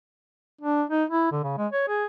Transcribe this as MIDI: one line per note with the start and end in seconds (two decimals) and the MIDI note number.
0.61 0.84 62
0.90 1.04 63
1.10 1.28 64
1.32 1.40 50
1.43 1.54 49
1.58 1.67 56
1.72 1.84 73
1.88 2.05 68